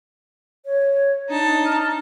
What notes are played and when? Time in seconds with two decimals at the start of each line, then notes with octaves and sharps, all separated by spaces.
0.66 C#5
1.30 D4 D#4 A5
1.65 F6